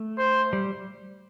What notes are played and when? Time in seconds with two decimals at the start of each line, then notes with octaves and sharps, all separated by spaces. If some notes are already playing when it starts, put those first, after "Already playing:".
Already playing: A3
0.18 C5
0.53 G3